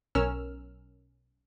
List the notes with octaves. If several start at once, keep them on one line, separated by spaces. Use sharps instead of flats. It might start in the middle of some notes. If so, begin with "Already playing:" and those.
B1 C#4 A#4 E6 F6